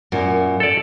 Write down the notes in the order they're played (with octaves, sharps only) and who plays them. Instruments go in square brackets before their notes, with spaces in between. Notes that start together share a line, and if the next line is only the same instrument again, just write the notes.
[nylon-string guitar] F#2 A#2
[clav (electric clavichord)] A4 D5